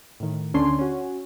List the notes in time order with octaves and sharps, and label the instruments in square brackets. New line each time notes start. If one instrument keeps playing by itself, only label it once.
[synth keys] A2 D#3
D2 D3 C#4 D4 C6
C#4 F#4